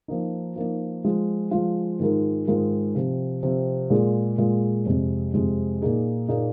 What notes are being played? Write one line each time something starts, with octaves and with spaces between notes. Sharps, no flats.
F3 A#3 D#4
F3 A#3 D#4
F3 G#3 F4
F3 G#3 F4
G#2 D#3 G#3 F4 A#4
G#2 D#3 G#3 F4 A#4
C3 F3 C4
C3 F3 C4
A#2 G#3 F4 G#4
A#2 G#3 F4 G#4
F2 C3 G#3
F2 C3 G#3
A#2 A#3 D#4 G#4
A#2 A#3 D#4 G#4